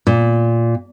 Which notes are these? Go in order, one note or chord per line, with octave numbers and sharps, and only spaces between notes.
A#2